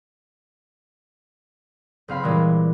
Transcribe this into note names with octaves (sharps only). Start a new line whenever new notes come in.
F#1 C4 F5 B5
A#2 E3 G3 G#3